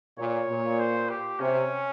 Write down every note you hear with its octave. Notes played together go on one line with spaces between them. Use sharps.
A#2 C#5
A#2
C5
G4
C3 C#4